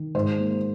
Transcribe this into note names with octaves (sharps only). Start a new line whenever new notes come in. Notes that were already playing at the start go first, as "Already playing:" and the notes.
Already playing: D#3
G#2 C5
A#3